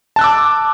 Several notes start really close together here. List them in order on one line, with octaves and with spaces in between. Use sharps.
A5 F#6 E6 D6